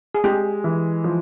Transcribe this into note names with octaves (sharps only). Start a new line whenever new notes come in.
G#4
G#3 G4
E3
F3